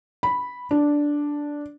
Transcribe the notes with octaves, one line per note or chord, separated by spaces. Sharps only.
B5
D4